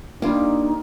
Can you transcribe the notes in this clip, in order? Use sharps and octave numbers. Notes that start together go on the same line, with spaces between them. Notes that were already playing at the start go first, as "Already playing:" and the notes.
G3 A#3 D4 D#4 F4